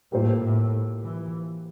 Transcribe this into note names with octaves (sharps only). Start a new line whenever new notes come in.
A2 G3 A#3 F4 C5
A2
E3